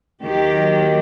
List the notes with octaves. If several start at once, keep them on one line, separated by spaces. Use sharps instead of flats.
D#2 D#3 F#3 G4